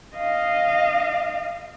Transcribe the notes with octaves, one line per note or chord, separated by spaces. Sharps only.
D#5 F5